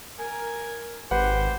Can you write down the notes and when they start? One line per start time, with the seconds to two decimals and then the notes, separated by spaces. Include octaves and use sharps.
0.19 A#4 G#5
1.11 G#1 G4 B4 C5 F#5